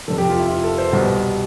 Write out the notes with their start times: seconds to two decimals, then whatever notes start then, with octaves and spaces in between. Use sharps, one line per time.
0.08 F1 F2 C3 A4
0.18 G4
0.29 F4
0.39 E4
0.50 F4
0.64 A4
0.78 C5
0.92 C2 B2 G3 B3